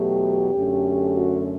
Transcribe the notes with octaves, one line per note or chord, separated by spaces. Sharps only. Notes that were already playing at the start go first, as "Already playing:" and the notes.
Already playing: E2 B2 F#3 A3 G4
F#2 D3 A3 C#4
F#4